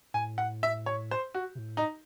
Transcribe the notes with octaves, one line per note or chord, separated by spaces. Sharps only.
A2 G#5
F#5
E5
C#5
C5
F#4
C3
A2
D#4